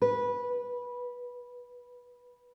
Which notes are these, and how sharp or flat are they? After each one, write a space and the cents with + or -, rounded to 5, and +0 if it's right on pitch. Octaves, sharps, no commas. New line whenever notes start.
B4 -15